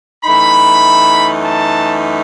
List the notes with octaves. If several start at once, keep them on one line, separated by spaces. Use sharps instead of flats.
F#2 E3 A3 D#4 B5
A5